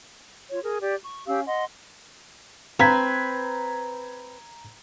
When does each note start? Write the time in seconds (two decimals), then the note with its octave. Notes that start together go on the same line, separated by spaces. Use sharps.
0.50 F4 C#5
0.64 G#4 A#4
0.81 G4 D5
1.04 C#6
1.26 C#4 G4 F5 E6
1.46 D#5 F#5 C6
2.79 C4 B4 A#5 G#6 B6